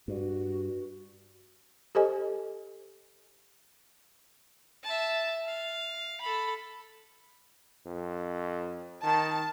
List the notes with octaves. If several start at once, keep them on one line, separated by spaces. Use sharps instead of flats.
G2 F#4
G4 A4 C5 D#5 G#5
E5 A5
F5
A4 B5
F2
D#3 A5